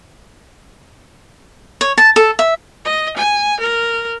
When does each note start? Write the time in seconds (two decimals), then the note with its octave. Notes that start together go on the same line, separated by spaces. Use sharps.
1.81 C#5
1.98 A5
2.16 A4
2.39 E5
2.85 D#5
3.17 G#5
3.60 A#4